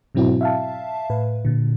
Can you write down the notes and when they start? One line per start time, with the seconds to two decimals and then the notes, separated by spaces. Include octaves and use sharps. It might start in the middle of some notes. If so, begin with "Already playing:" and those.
0.15 G#2 B2 F#3 C4 E4 F#4
0.41 E5 F5 A5
1.10 A2 B4
1.45 A#2 D3